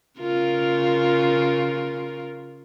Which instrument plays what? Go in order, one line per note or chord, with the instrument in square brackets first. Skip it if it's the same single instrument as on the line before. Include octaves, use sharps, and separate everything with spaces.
[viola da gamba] C#3 F4 A#4